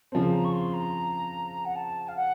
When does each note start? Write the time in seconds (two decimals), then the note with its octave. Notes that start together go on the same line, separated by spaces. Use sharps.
0.12 C#3 F3 C4 A5
0.33 A#5
0.45 C#6
0.53 C6
0.74 A#5
1.65 F#5
1.76 A5
2.08 F5
2.16 F#5